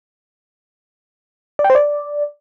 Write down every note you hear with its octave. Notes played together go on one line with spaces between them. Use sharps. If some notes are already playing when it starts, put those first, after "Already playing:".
D5
G5
C5
D5